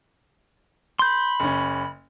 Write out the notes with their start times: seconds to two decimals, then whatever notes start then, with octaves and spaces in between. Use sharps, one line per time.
0.99 B5 C6 G6
1.40 F#1 C#4